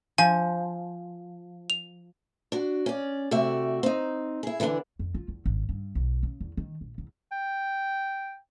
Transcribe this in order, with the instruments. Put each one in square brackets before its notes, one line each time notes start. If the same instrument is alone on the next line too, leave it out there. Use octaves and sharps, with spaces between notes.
[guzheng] F3 [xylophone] G#5
[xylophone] F7
[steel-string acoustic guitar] D4 F#4
C#4 D5
C3 A3 F#4 D5 E5
C4 D#4
E4 G#4
D3 E3 B3 C#4 D4
[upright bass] F2
F4
E2
G#1
G2
B1
C#3
E2
D#3
A#1
E2
[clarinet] G5